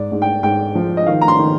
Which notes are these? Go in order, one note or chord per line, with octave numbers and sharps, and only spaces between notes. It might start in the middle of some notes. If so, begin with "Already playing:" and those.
Already playing: G#2 D5
G#2
G5
G#2 G5
F3
D#5
D#3 F5
A#5
C6
D#3